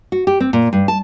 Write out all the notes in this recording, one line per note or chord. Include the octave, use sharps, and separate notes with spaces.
F#4
G4
C4
A#2
G2
A5